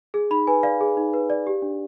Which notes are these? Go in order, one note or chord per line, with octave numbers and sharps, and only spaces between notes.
G#4
D#4 B5
B4 G#5
D5 F5
G#4
D#4
B4
D5
G4
D4